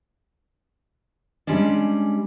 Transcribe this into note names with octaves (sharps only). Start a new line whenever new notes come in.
G3 G#3 C#4 D4